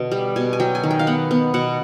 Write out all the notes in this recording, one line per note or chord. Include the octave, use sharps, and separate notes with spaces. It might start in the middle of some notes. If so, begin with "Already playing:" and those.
Already playing: B2 D3
G3
B2 G#5
G#5
F#3 G5
G#5
D#3
G5
F5
B3 F#5
B3
B2 F#5